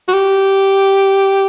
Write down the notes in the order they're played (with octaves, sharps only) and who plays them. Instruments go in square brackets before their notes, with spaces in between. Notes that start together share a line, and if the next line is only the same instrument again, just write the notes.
[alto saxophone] F#4
G4